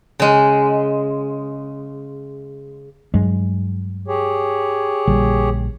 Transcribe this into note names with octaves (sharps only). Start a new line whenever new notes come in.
C#3 G#3
G2 F#3 G#3
G4 G#4 C#5
A#1 D3 G3